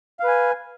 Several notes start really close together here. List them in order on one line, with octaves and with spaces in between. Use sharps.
F5 B4 G#5